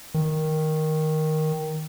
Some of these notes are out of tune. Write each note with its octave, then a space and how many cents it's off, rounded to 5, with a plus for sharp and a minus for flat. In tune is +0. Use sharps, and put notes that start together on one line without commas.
D#3 +5